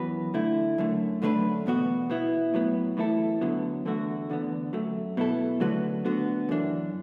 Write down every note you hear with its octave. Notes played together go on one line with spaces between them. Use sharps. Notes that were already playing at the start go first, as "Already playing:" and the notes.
Already playing: F#2 E3 B3 F#4 B4
D3 A3 E4
F#2 D3 A3
F#2 D3 A3 D4 B4
E2 B2 B3 F#4
B2 B3 E4
A2 F#3 B3
A2 E3 A3 E4 A4
D3 F#3 B3
E2 D3 A3 F#4
E2 D3 B3
F#2 F#3 A3
B2 B3 E4 A4
D3 F#3 A3 F#4 B4
D2 D3 B3 F#4
F#2 E3 D4